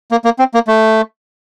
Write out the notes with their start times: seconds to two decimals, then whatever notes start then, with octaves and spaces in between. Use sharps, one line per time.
0.11 A#3
0.25 A#3
0.39 C4
0.54 A#3
0.67 A3